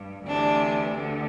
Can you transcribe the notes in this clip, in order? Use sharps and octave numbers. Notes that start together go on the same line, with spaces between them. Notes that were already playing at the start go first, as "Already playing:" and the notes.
Already playing: G2
D2 C3 E3 D4
D2 D3